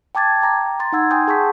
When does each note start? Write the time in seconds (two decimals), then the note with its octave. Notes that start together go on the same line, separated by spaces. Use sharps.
0.15 G5 A5 D6 G#6 A6
0.42 G5 A#5 A#6
0.79 A#5 C6 A6
0.92 D#4 F#5 E6 G#6
1.11 G5 G#5 C6 D#6 G6
1.28 G#4 F#5 A5 C#6 G6 B6